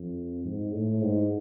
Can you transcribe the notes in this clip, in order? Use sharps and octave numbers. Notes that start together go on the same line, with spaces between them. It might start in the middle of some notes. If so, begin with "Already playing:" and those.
Already playing: F2
G#2
A2
G#2